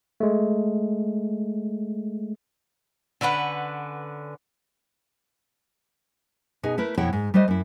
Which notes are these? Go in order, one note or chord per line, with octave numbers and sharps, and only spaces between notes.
G#3 A3
D3 C#4 B4 F#5
B2 D#4 G#4
A3 E4 A#4 B4
F2 B2 E4 C#5 F#5 G5
G#2
G3 A3 B4 C5 D#5
F#2 E4